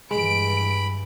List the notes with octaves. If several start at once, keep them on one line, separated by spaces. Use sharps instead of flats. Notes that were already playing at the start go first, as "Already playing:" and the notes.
G2 E3 G#3 B5 D7